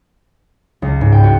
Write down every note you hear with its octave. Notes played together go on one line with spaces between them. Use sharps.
C#2
G#2
G5
F#4